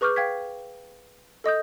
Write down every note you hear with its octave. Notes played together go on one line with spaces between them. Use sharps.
G#4 B4 C#6 D6 F6 G6
F5 G5 G#6 B6
A4 D#5 D#6 G6